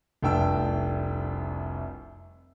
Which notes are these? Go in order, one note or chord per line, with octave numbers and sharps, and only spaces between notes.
F1 C2 D4 G5 A5 E6